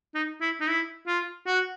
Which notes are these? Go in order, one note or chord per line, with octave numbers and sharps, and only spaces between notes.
D#4
E4
D#4
E4
F4
F#4